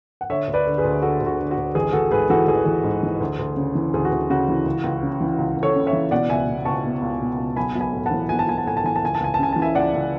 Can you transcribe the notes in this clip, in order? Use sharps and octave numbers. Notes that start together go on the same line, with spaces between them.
F#5
D3 C#5 E5
D2
B4 D5
D3
G#4 B4
D2
D3 F#4 A4
D2
F#4
D3
F#4
D2
A1 G#4
A1 F#4 A4
G#2 G#4 B4
E3 F#4 A4
A1 G#4
A1
G#2
E3
D2
D2
C#3
E3
D2 G#4
F#4
D2
C#3 F#4
E3
C#2
C#2
C#3
E3
C#2
C#2
A4 C#5
C#3
C#5 E5
E3
B2 D5 F#5
C#2 E5 G#5
B2
C#2 A5 C#6
B2
C#2
B2
C#2
B1 G#5 B5
B1
G#5 B5
A2
E3 F#5 A5
B1 G#5
A5
B1 G#5
A5
A2 G#5
A5
E3 G#5
A5
C#2 G#5
A5
C#2 G#5
A5
C#3 G#5
E3 A5
E5 G#5
C#2 D5 F#5
C#2